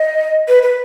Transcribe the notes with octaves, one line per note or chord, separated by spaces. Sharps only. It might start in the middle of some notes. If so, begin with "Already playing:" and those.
Already playing: D#5
B4
B4